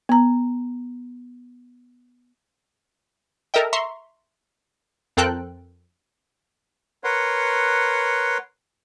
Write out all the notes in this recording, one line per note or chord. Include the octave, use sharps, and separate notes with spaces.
B3 A#5
A4 A#4 D#5 E5 G5
E5 A#5 C6 C#6
F2 C4 A4 A#4 G5 F#6
A#4 B4 C#5 F#5 C6